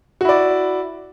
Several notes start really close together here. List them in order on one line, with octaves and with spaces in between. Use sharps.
F#4 E4 D5